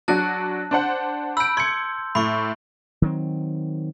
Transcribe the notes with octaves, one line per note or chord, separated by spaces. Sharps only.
F#3 D4 F#4 A5 F#6
D4 C5 F#5
B5 E6 G6 D7
C6 G#6 C#7
A2 B5 C#6
D#3 F#3 C4